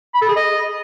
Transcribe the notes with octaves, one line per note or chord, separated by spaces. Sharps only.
B5
A4
G#4
D#5